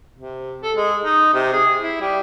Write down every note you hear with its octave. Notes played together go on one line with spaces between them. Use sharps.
C3
A4
G#3
D#4
C3
G#4
E4
G3